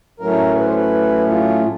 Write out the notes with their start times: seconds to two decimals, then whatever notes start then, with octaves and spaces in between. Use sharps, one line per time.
0.20 A2 F#3 A3 C#4 A#4
0.56 B4
0.65 C5
0.74 B4
1.29 F4